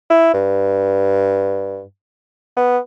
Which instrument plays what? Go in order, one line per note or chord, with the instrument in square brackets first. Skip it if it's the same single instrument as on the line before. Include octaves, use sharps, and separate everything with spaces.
[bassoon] E4
G2
B3